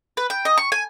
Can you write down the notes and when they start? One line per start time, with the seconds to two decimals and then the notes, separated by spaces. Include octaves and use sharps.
0.17 B4
0.30 G5
0.45 D#5
0.57 C#6
0.72 G#5